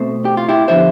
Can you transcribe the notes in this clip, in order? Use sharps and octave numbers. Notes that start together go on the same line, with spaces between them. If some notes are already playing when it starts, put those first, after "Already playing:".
Already playing: B2 A3 C4
G4
F4
E4 G4
D3 F3 B3 C5 E5